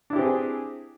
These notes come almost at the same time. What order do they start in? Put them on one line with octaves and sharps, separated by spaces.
D4 E4 G4 C4 G#4